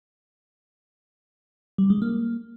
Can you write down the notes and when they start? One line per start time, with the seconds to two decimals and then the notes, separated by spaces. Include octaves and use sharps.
1.78 G3
1.90 G#3
2.02 A#3